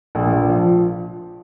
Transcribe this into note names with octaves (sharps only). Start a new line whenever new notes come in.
A#1
A#1
F3